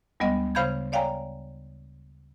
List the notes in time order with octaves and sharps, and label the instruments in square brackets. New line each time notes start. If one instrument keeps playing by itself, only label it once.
[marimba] D2 G3 G#3 B3 D#5 A#6
C#3 C5 F5 B5 G6 G#6
C#5 D5 F5 G5 G#5 A#5